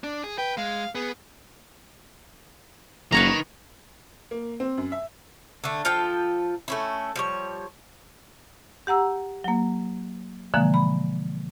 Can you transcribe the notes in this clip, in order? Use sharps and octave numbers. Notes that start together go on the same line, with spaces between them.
D4
G#4
B4 G5
G#3 F5
B3 G#4
F#1 D#3 B4 C#5 A#5
A#3
C4
F#2
E5
D3 A3
F3 F4 A4 G5
A3 C#4 E4
F3 G3 C#5
G4 F#5 A#5 E6
F#3 A#3
B2 D3 E3 F3 G#3 A#3
B5